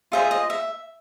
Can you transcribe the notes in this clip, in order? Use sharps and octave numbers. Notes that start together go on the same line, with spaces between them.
F4 G#4 C5 D#5 E5
D#5
E5